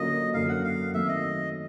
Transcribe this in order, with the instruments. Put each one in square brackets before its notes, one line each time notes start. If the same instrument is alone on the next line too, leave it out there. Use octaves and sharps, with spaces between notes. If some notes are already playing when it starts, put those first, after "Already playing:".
Already playing: [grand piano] D3 F#3 A#3 C#4 F4 [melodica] D#5
[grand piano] F#2 D3 F#3 A#3 [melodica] F5
[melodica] F#5
F5
[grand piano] D#3 F#3 A3 C4 [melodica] E5
[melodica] D#5